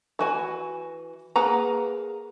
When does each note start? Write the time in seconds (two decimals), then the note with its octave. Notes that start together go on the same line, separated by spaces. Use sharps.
0.19 E3 F#4 G#5
1.36 A#3 G#4 B4 F#5 A#5